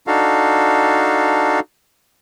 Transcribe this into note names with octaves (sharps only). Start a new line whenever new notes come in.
D4 D#4 F#4 A4 F5